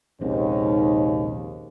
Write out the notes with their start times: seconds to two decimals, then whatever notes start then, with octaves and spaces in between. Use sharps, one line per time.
0.21 A#1 D#2 G#2 C3 C4 C#4